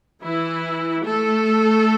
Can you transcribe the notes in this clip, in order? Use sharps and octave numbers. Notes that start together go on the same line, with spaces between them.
E3 E4
A3 A4